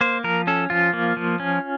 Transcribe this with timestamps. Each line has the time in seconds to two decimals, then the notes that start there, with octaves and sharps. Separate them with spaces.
0.01 A#3 C5
0.24 F3 A#4
0.47 C#4 A4
0.70 F3 F4
0.93 A#3
1.17 F3
1.40 C#4